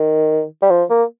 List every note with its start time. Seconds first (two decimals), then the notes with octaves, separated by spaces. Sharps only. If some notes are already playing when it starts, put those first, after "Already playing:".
Already playing: D#3
0.62 G3
0.70 F3
0.90 A#3